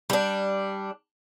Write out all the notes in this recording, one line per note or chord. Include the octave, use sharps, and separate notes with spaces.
G3 D4